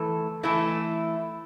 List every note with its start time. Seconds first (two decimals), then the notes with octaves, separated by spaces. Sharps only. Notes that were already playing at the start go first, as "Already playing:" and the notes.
Already playing: E3 A3 A4
0.43 E3 A3 E4 A4